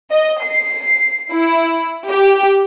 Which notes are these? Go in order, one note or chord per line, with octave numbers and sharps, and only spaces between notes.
D#5
C7
E4
G4